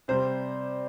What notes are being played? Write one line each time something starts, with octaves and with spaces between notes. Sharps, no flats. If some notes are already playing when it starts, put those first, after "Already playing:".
C3 G3 C5